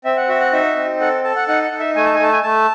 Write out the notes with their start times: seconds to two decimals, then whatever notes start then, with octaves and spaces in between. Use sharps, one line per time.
0.05 C4 E5
0.17 F#5
0.28 F#4 E5
0.40 F#5
0.53 D#4 E5
0.76 C4
1.00 A4 F#5
1.24 A4 A5
1.36 F#5
1.48 D#4 F#5
1.64 F#5
1.72 D#4
1.80 E5
1.96 A3 G#5
2.05 A5
2.14 G#5
2.20 A3 A5
2.32 G#5
2.43 A3 A5